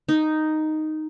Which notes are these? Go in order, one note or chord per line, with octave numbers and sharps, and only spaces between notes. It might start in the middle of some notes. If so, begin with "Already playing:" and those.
D#4